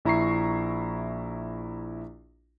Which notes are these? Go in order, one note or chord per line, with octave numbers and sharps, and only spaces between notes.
A#1 E4 A#5 C#6 C7